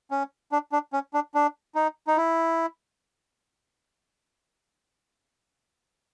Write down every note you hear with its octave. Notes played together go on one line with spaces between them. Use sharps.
C#4
D4
D4
C#4
D4
D4
D#4
D#4
E4